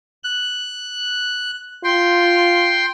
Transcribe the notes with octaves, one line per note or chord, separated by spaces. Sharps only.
F#6
F4 G5 C6